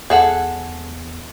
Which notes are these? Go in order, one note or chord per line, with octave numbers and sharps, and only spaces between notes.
E2 G#4 A4 F#5